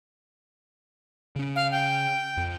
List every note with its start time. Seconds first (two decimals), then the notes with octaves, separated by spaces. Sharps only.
1.36 C#3 C#4
1.56 F5
1.71 G5
2.37 F2